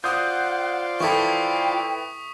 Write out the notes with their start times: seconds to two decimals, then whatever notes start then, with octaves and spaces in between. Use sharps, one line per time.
0.04 F4 C5 D5 F#5 D#6 G6
1.00 E3 E4 A4 G5 C#6 D#6 B6